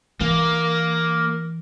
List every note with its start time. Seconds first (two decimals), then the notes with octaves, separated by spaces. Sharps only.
0.20 E3 A#3